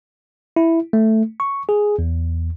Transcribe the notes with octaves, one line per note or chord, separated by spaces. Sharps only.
E4
A3
C#6
G#4
E2